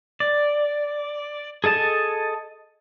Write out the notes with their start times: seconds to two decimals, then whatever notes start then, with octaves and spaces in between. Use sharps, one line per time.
0.20 D5
1.64 G#4 A4 D#5 A5